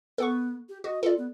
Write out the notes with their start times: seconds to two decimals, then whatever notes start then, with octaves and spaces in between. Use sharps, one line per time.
0.18 B3 A4 F#5 C#6
0.69 G4
0.84 F#4 D#5
1.03 F4 A4 D5
1.18 B3